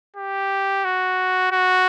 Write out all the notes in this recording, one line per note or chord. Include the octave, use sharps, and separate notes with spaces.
G4
F#4
F#4